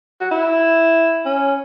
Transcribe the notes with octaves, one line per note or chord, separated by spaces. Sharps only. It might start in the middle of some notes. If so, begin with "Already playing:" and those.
F#4
E4
C#4